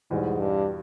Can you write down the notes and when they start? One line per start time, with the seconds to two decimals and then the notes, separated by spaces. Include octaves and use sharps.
0.11 E2 G#2 B2 G3
0.40 G2